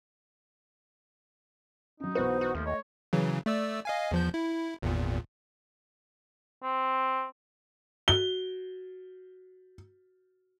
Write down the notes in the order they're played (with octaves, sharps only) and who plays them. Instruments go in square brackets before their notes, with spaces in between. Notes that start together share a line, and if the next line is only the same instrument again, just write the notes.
[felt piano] F#3 C#4 [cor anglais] D#4
[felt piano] B1 E3 B4 [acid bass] F#4 [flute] C5
[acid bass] F#4
[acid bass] D#2 [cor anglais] F3 [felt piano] A3
[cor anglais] C#5 [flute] D#5
[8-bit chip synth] C#3 E3 F#3
A3 D5 E6
D#5 F5 G#5
E2 F3 G6
E4
G#1 E2 A#2
[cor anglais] C4
[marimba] F#4 [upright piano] G7